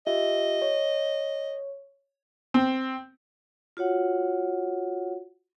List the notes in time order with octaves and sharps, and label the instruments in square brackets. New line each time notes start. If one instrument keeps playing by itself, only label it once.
[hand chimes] F4 G4 E5 [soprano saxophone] D#5
[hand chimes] C#5
[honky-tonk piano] C4
[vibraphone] F4 F#4 C#5 F#5